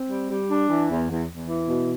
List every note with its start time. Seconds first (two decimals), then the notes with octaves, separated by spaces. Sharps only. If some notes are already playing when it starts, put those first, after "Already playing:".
Already playing: C4
0.10 G3
0.29 G3
0.50 D4
0.69 E3
0.89 E2
1.10 E2
1.29 E2
1.48 E3
1.68 B2